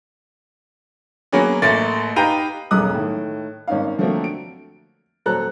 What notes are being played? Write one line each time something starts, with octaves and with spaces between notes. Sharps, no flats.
F#3 A#3 B3 C#4 G#4
A1 A3 A#3 A6
D#4 G4 B4 F5 G5 A#5
E1 B1 F#2 G#3 D#6 F#6
A2 D#3
G#1 C#4 D#4 F5
D3 F3 F#3 A3 A#3 C4
D7
D#1 F#3 A4 C5 A#5 F#6